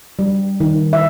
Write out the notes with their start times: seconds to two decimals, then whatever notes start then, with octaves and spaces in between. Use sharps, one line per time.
0.19 G3
0.60 D#3
0.93 E5